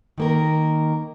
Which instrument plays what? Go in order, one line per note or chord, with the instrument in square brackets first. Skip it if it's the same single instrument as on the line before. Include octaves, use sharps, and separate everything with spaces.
[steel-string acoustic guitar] D#3 A#3 A#4